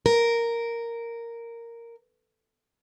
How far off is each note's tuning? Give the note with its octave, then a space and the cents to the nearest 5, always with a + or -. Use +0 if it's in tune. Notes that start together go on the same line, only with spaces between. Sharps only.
A#4 -5